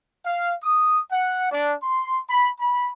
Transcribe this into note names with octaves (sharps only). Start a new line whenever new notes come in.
F5
D#6
F#5
D4
C6
B5
B5